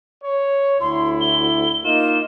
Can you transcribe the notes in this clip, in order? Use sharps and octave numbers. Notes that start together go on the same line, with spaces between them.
C#5
D2 E4 C6
G7
A#3 D#4 F4 E7